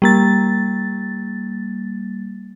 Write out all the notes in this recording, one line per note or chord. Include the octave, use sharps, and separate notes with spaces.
G3 A#3 A6